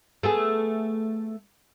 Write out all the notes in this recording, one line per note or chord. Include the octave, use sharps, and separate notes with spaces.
A3 B3 G#4